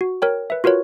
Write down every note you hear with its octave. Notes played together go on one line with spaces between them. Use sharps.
F#4
A#4 C#5 G5
B4 E5
F4 F#4 A#4 B4 C#5